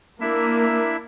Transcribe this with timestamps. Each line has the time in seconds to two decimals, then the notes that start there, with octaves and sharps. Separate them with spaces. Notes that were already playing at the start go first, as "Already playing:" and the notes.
0.21 A#3 D4 E4 E5